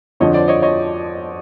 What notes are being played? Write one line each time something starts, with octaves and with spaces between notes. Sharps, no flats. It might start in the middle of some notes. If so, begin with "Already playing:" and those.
F2 D3 F3 C#5 D#5
C5 D5
C#5 D#5
C#5 D#5